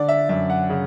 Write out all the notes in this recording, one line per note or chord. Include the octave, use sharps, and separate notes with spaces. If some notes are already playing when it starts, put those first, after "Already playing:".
Already playing: D3 D5
E5
F#2 E5
F#5
C#3